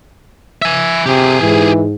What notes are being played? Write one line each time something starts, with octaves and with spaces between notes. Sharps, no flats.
E5 G#5
C3 G4 G#4
G#2 E3